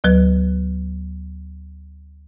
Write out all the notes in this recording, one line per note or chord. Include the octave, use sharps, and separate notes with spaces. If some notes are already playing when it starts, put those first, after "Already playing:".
D2 F#3 B4